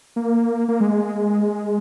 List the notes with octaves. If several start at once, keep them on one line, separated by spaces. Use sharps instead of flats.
A#3
A#3
G#3